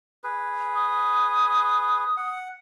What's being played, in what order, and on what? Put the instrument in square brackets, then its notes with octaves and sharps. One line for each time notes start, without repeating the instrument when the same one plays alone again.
[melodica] G#4 B4
[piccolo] D#6
[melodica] F#5